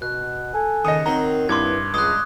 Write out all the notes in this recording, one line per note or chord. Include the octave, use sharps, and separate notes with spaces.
B2 F#6
A4 G#5
D#2 C#3 D#5 D#6
D#3 F#3 C4 A#5
G2 D#3 E4 B4 C6 D6 G#6
C#2 G#3 D#6 F#6